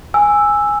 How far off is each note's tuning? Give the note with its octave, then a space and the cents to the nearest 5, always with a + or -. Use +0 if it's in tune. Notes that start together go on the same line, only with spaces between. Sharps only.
G#5 -5 E6 +0